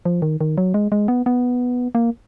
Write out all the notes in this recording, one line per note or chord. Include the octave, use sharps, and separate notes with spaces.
F3
D#3
D#3
F#3
G#3
G#3
B3
B3
A#3